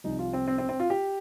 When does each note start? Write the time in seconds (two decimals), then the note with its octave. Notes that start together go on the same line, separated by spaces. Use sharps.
0.04 C2 C3 F3 D#4
0.19 F4
0.33 C4
0.48 C4
0.58 C4
0.69 C4
0.80 F4
0.90 G4